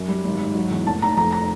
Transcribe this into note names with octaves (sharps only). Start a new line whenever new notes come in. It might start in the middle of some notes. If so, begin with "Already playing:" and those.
Already playing: F#2
G3
G#1
G#2
F#3
E2
F1 A5
F1 A#5
F2 A#5
A#5